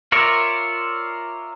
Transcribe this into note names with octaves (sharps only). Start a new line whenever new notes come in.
F4 A#4 C#5 D5 E5